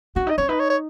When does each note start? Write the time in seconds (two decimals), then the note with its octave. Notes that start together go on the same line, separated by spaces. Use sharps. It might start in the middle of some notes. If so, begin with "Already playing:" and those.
0.16 C#4 F#4
0.27 D#4 D#5
0.38 C#4 C#5
0.49 D#4 B4
0.60 C#5
0.70 C#5